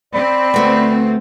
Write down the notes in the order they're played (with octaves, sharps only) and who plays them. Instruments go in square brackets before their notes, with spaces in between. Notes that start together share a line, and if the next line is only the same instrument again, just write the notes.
[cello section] C4 [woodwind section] D5 B5
[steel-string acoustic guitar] D2 A3 B3